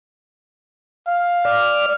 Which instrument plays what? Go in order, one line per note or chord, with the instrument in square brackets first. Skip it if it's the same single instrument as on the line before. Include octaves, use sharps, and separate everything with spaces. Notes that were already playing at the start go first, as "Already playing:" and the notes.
[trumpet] F5
[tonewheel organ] D5 [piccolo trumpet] F6